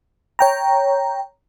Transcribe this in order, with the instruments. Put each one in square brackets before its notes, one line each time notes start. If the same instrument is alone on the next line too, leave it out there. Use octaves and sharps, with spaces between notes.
[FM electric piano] C#5 G5 A#5